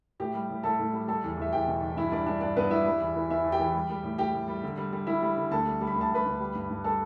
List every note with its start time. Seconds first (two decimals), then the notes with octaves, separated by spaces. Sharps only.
0.20 A2 G4 G5
0.34 G3
0.50 A2
0.63 A2 A4 A5
0.79 A2
0.93 G3
1.08 G3 A4 A5
1.24 E2
1.37 E2 E5
1.53 E2 G4 G5
1.67 B2
1.82 E2
1.97 G2 E4 E5
2.11 G3 D4 D5
2.26 G3 D4 D5
2.41 G2 D4 D5
2.56 G2 B3 B4
2.70 G3 E4 E5
2.86 G3
3.00 E2
3.16 E3
3.30 E2 E4 E5
3.44 E2
3.52 G4 G5
3.60 E3
3.74 G3
3.90 G3
4.03 A2
4.18 A2 G4 G5
4.34 A2
4.48 G3
4.63 D3
4.78 G3
4.93 G3
5.07 G3 E4 E5
5.22 G3
5.37 D3
5.51 D2 A4 A5
5.66 G3
5.81 G3
5.87 B5
5.95 D2
6.01 A5
6.11 G3 B4 B5
6.26 D2
6.40 G3
6.55 G2
6.70 G2
6.84 G3 A4 A5